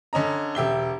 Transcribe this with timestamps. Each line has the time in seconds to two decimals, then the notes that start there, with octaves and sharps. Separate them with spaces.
0.13 D3 C#4 D#5 A#5
0.55 E1 G4 E5 G7